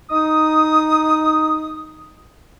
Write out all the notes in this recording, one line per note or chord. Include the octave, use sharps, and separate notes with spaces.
D#4 D#6